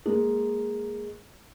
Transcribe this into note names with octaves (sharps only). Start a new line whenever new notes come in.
G#3 A#3